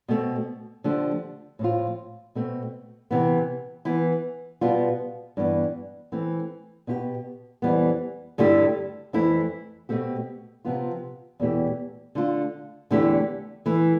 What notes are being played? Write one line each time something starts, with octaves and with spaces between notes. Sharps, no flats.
B2 A3 C4
D3 F3 A3 D4 G4
A2 F3 C4 F4
B2 A3 C4
C3 E3 B3
E3 B3 E4
B2 G3 B3 F4
G2 E3 B3
E3 A3 C4
B2 B3 E4 G4
F2 E3 G3 B3
G2 D3 A3 E4 G4
F2 E3 A3 E4
B2 A3 C4 G4
C3 F3 B3 F4
E2 B2 A3 E4 G4
D3 A3 D4 F4
E2 D3 A3 E4 G4
E3 A3 E4